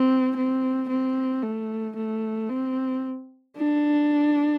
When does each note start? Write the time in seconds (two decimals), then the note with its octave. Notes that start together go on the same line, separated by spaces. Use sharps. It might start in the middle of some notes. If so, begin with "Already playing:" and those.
Already playing: C4
0.37 C4
0.89 C4
1.43 A3
1.96 A3
2.49 C4
3.56 D4